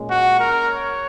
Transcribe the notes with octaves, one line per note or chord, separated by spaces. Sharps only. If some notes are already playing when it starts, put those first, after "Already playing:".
Already playing: A#2 G#3 C#4
F#4
A#4
C#5